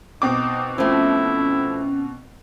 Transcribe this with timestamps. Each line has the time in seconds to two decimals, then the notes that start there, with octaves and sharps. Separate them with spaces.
0.22 B2 C4 D#4 D6
0.78 F3 A3 C#4 E4